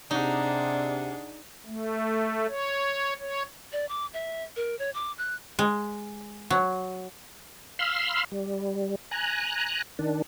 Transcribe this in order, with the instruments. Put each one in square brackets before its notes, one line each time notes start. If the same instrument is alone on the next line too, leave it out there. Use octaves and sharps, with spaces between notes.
[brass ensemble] C3 [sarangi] D4 [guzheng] D#4 [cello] G#4 F#5
[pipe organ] A3
C#5
C#5
[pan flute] D5
D6
E5
A#4
C#5
D6
F#6
[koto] G#3
F#3
[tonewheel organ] F5 B5 C6 E6 F6
G3
G#5 A#5 F#6
D#3 D4